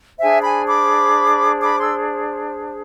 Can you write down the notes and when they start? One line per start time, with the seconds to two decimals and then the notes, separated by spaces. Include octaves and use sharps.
0.20 D4 G#4 C5 E5 G#5
0.44 G#5 B5
0.67 B5 D6
1.62 B5 D6
1.80 C6 E6